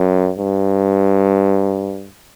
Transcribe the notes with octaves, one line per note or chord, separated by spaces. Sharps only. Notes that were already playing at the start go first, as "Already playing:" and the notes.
Already playing: F#2
G2